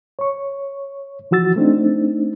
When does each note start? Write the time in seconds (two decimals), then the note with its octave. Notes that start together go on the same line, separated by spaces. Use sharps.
0.19 C#5 C#6
1.31 E3 F3 F#4 E6 A6
1.56 A3 C4 D4 D#4